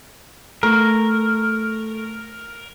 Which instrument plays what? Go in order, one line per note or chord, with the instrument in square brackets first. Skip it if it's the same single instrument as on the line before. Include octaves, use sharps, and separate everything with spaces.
[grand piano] A3 [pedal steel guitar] A#4